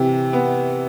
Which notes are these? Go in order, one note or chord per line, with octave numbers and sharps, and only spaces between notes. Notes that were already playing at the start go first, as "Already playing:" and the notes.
Already playing: C3 E3
B3